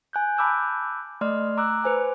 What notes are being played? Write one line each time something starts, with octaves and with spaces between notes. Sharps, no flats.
G#5 F#6 G6
A5 B5 D6 E6 F#6 G6
A3 D5 D#5 C6 F6
A#5 D6 E6 F#6
B4 C5 G#5